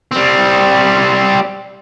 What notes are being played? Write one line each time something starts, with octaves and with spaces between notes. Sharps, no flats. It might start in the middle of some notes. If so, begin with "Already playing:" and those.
G3 C4